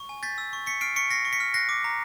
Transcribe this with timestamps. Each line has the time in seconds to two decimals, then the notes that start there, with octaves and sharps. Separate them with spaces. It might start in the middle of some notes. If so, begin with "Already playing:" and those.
Already playing: C#6
0.09 G#5
0.23 G6 A6 B6
0.38 E6
0.53 C#6
0.66 C#6 B6 C#7
0.81 F6 C7 D7
0.96 C#6 B6 C#7
1.10 F6 A#6 C7
1.25 C#6
1.33 B6 C#7
1.40 F6
1.54 F#6 A#6 C7
1.69 D6
1.84 A#5